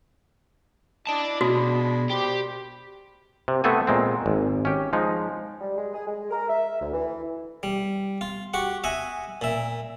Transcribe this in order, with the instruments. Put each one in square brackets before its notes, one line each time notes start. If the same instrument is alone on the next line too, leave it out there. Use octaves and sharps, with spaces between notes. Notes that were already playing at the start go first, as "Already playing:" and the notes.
[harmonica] E4 D#5 [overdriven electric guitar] D5 A5
[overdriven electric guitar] B2 [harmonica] G#3 D4 B5 [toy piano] F#4
[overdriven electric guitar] G4 [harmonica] C5 D5 B5
[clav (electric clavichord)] C3
A3 B3 C4 A4 F#5 G#5
A#2 G#3 C4
G#1
C#4 G4
F3 G#3 D#4
[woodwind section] G3
G#3
G#4
G#3
A#4
E5
D2
E3
[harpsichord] G3
F4
F#4 G4 F#5
D#5 E5 F#5 G#5
A#2 E5